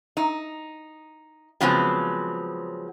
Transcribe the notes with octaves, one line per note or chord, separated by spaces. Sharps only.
D#4
C#3 F3 F#3 G#3 B3 C4